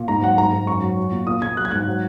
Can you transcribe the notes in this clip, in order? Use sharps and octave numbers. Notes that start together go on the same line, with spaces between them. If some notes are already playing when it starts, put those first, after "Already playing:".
Already playing: A#2
G#2 A#5
F#3 F#5
G#2 A#5
G#2
F#2 C#6
F#3
F#3
A#2
A#2 D#6
A#2 G#6
F#3 F#6
G#6
G#2 F#6
F#3